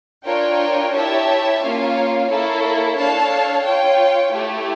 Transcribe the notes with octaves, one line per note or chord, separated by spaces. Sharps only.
D4 F4 A#4 C#5 G5
E4 G4 C#5 E5 A5
A#3 C#4 F4 C#5 F5
A#3 E4 A4 C#5
D4 A4 C#5 F5 A5
F4 C#5 G5
A3 E4 G4